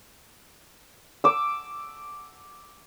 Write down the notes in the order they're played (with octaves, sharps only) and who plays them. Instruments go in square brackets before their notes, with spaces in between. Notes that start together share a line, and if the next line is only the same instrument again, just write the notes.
[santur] D6 E6